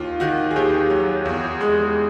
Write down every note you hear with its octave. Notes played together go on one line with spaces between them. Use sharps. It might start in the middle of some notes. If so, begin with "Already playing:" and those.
Already playing: D#2 F4
D#3 F#4
G#4
D#2 G4
F#3
E2
G#3